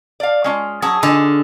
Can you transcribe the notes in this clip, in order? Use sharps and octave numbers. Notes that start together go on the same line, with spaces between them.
D5 F5
G#3 C#4 F4
F#3 C#4 G#4 A5
D3 F4 D#5 G#5